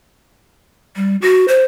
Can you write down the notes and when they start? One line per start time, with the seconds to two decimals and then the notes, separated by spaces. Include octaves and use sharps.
0.96 G3
1.22 F#4
1.48 C5